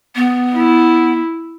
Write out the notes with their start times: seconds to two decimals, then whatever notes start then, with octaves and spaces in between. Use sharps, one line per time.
0.16 B3
0.55 E4